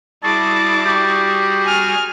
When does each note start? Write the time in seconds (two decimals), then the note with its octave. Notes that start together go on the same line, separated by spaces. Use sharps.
0.23 G3 E4 F#4 G#4 A5 D6
0.86 G4
1.66 G#5 F6